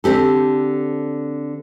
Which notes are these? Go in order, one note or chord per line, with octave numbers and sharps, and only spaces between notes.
D3 C4 G4 A4